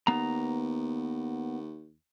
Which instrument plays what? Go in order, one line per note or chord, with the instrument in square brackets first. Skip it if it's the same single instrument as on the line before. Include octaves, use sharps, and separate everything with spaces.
[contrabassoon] D#2 [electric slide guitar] B3 A#5